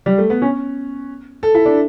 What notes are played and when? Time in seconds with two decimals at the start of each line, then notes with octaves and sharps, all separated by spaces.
0.06 G3
0.18 A3
0.30 B3
0.42 C#4
1.43 A4
1.55 E4
1.66 D4